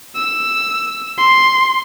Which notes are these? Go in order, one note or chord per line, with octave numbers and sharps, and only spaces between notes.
E6
C6